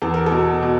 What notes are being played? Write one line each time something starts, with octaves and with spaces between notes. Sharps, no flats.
E2 A4
A#4
A4
B2
B2